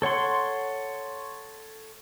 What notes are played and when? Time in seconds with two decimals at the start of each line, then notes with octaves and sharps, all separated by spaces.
0.02 A4 C#5 F#5 C6